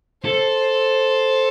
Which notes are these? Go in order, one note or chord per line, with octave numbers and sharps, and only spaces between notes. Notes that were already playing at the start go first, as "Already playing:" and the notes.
A4 C5